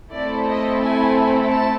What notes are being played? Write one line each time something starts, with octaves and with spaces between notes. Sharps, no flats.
A3 C4 E4 A4 D5
D#5
G#5
A5